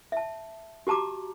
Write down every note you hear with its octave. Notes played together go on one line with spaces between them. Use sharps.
E5 A5
F#4 G4 A5 A#5 D6